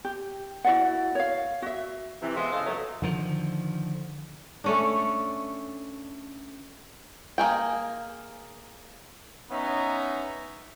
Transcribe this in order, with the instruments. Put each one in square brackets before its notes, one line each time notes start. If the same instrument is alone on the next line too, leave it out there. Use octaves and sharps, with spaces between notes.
[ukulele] G4
E4 F#4 D5 F#5
C#5 F5
F#4 E5
[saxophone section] C3 E3
G#3 B3 F4 C5 D#5 E5
C#3 E3 A4 D#5 F5
F#2 A#2 F#3 A3
[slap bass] D3 D#3 F3
[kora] A3 C#4 D4
[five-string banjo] A#3 G#4 G5
[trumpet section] B3 C#4 D#4 E5 A#5